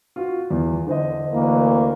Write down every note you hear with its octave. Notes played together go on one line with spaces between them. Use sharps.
F4 F#4
E2
D3 C5 D#5
D2 E3 A#3